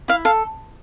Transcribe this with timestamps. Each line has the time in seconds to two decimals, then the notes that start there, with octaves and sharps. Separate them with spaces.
0.08 E4 F5
0.25 A4 F5